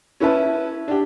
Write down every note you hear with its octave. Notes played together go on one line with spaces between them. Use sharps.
C#4 E4 B4 E5 A5
D4 G4